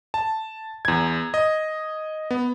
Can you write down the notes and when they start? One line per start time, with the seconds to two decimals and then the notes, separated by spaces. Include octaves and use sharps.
0.14 A5
0.85 E2 G#6
1.34 D#5
2.31 B3